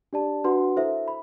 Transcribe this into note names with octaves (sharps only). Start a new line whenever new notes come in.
D4 G4 D5 A5
D4 F#4 B4 F#5 C6
E4 A4 C5 E5
B5